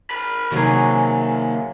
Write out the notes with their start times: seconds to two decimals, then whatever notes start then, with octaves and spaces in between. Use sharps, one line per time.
0.10 A#4 B5
0.52 C3 D#3 F#3 A#3 C4 F#4 G#4